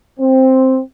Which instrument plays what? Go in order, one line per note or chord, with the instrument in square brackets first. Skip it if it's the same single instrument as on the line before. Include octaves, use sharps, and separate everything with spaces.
[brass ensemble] C4